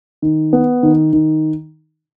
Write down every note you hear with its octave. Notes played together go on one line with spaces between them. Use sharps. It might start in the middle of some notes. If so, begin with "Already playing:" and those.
D#3
B3
D#3
D#3